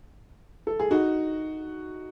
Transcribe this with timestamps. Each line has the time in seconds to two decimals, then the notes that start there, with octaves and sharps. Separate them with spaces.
0.67 A4
0.80 G#4
0.91 D#4 F#4